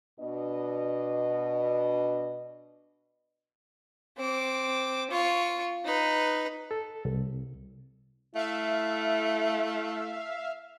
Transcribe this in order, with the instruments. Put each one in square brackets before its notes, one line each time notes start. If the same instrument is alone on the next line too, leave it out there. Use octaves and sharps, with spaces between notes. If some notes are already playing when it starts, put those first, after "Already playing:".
[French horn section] B2 D4 D#5
[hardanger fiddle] C4 D6
F4 C#6
D#4 B4
[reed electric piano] A4
C2
[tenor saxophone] A3 [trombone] E4 [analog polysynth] E5 F5